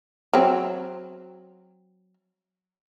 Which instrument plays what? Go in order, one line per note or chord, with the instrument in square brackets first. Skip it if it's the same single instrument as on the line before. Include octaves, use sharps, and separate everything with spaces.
[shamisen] F#3 C4